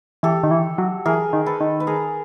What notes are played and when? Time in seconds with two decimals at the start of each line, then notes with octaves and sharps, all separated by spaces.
0.23 E3 G4 A4
0.43 D#3
0.51 E3
0.78 F#3
1.06 E3 G#4 A#4
1.33 D#3
1.46 A4 B4
1.61 D#3
1.80 B4
1.87 G#4 A#4